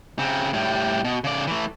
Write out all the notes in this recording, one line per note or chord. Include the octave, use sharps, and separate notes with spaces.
C#3 C4
A2 G3
B2
C#3 D5
E3 A3